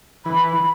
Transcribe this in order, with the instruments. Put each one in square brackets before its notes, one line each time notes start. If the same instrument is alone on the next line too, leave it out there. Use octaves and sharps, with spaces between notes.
[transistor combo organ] E3 [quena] B5